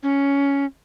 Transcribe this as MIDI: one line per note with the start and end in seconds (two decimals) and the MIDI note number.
0.03 0.65 61